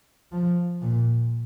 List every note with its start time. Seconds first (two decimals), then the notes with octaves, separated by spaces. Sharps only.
0.32 F3
0.81 A#2